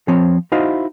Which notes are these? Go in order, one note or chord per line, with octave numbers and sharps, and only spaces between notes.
F3 C4 C#5
D#4 E4 F#4 C5 D#5 F5